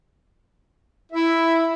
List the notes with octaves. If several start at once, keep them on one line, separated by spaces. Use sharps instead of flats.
E4 E5